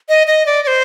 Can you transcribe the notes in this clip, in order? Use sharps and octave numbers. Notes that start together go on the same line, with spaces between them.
D#5
D#5
D5
D5
C5